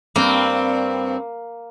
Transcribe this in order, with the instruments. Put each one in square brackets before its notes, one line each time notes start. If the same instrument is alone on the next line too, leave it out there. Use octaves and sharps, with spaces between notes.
[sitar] G2 C4 [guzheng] A#3